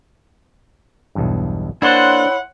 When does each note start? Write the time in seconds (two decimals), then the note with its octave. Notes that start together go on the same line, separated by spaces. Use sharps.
1.15 B1 E2 G2
1.82 A#3 D4 E4 C5 C#5 F#5 C6